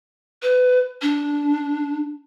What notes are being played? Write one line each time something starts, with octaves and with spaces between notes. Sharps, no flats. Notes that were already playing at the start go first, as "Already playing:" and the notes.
B4
D4